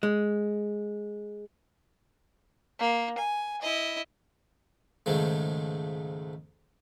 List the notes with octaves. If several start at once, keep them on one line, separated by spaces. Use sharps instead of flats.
G#3
A#3
G#5
E4 D#5
C#2 G#2 D#3 F3 A3